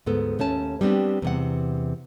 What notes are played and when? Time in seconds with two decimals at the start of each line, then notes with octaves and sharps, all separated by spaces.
0.06 D2 G#2 B3 A4
0.39 D#2 A3 C#4 A5
0.81 G3 B3 C4 D4 G4
1.22 E2 C3 F#5